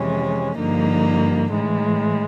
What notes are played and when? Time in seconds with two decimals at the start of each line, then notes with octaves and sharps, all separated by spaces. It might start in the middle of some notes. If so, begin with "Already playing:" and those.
Already playing: F2 C3 E3 G#3 C#4
0.57 G2 D3 F3 A#3 D#4
1.52 A2 E3 G#3